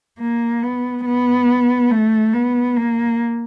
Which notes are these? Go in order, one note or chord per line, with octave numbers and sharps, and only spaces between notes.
A#3
B3
B3
A3
B3
A#3